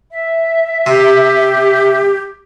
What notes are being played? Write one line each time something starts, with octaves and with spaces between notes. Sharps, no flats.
E5
C3 G4